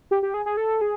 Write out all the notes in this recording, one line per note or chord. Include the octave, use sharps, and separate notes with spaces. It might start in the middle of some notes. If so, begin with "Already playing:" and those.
G4
G4
G#4
G#4
A4
G#4